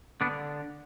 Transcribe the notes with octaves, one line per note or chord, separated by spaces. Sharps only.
D3 B3 D4